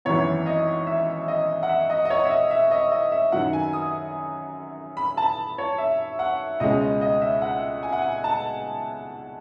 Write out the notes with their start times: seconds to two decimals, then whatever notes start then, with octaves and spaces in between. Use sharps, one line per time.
0.05 G#1 F#2 E3 B3 C#5
0.46 D#5
0.87 E5
1.28 D#5
1.63 F#5
1.69 E5
1.90 D#5
2.05 D#5
2.10 C#5
2.25 E5
2.30 D#5
2.51 E5
2.71 D#5
2.92 D#5
3.12 E5
3.32 F#2 D#3 F#3 F#5
3.53 G#5
3.73 D#6
4.97 B5
5.17 A5
5.58 C#5
5.78 E5
6.19 F#5
6.60 C#2 B2 G#3 C#4 D#5
6.81 D#5
7.01 D#5
7.22 E5
7.42 F#5
7.83 G#5
7.92 F#5
8.02 G#5
8.24 A5